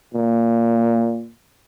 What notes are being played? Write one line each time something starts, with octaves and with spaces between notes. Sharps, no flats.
A#2